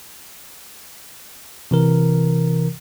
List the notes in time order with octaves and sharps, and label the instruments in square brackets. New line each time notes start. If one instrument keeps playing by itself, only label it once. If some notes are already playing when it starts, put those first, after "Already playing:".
[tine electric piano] C3 E3 A#4